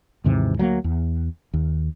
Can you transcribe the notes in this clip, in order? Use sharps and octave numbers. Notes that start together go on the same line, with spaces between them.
D#2 G#2 C3 E3
D2 F#3 A3 A#3
E2
D#2